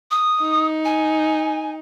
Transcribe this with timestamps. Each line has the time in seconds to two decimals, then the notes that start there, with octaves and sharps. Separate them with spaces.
0.11 D#6
0.41 D#4
0.85 G#5